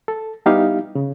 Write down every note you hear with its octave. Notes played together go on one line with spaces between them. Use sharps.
A4
G3 B3 D#4 E4 G4 F5
C#3